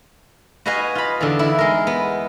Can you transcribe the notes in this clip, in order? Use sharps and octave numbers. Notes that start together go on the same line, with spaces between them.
F#4 B4 D#5 F5 G#5
F4 B5
E2 D3
E4
G#3 A#4
B3